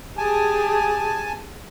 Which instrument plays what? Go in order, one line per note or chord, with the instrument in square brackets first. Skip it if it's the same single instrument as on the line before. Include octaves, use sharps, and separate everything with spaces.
[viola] G4 G#4 [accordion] G#5 A5